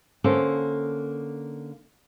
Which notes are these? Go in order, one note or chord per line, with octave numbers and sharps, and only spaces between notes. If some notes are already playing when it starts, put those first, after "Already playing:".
D3 A#3 C#4 A4 C5